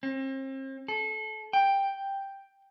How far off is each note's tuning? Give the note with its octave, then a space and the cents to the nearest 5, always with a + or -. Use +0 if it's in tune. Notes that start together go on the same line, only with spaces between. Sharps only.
C4 +40
A4 -25
G5 +5